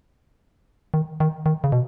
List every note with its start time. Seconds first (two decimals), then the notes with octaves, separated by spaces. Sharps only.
0.94 D#3
1.20 D#3
1.46 D#3
1.64 C#3
1.72 B2